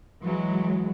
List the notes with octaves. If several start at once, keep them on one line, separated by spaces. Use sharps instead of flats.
E3 F#3 G#3